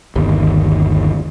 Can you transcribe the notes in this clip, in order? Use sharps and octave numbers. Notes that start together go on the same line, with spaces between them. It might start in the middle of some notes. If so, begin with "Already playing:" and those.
G1 D#2